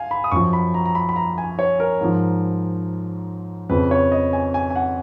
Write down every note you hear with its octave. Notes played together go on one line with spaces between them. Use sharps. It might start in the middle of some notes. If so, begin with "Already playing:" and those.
Already playing: F5 G#5
B5
D#6
F#2 F3 C#6
B5
A#5
A#5
B5
B5
A#5
G#5
C#5
A#4
G#2 F3
F2 C#3 F3 B4
C#5
D#5
G#5
G#5
G#5
F#5